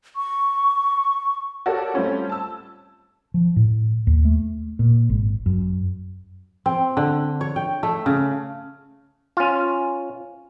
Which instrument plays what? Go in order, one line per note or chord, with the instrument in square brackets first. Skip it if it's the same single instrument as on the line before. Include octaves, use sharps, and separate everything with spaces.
[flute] C#6
[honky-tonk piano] F#4 G4 A4 A#4 C#5 D5
G3 A3 C4 C#4 F4
A5 E6
[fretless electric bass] F3
A2
D#2
A3
A#2
G#1
F#2
[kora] C4
D3
C#5
G5
A3
C#3
[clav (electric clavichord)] C#4 F4